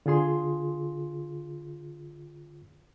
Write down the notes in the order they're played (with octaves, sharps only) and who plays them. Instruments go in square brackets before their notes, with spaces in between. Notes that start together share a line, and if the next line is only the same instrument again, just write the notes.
[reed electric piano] D3 F4 G#4 C6